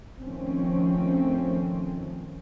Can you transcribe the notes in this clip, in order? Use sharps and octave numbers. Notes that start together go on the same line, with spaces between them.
D#3 F3 A3 C4 C#4